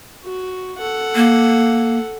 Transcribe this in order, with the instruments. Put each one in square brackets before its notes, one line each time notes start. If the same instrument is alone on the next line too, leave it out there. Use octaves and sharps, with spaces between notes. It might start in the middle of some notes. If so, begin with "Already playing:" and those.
[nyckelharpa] F#4
A4 F#5
[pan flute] A#3